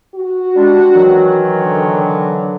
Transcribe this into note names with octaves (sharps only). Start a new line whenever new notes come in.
F#4
G3 G#3 D4
D#3 E3 F#3
D3